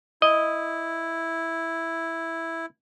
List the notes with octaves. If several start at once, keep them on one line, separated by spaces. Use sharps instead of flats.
E4 D#5